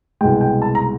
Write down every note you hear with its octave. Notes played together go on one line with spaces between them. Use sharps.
C2 B2 G#3 G5
G5
A5
A#5